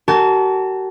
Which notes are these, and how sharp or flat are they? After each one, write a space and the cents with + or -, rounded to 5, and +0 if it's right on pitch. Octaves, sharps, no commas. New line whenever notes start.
F#4 +45 A#4 -35 A5 -30